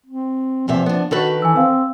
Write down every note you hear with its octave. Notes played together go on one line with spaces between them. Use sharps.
C4
E2 C3 F3 E5
B3 D4
D#3 F#4 A4 B4
E3 G#5 E6
C4 F5 E6